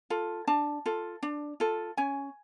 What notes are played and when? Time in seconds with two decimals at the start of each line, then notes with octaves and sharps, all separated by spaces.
0.10 F4 A4
0.47 D4 A5
0.86 F4 A4
1.23 D4
1.60 F4 A4
1.97 C#4 G#5